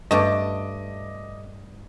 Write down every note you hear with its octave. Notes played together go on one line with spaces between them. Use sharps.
G2 A3 D#5 D6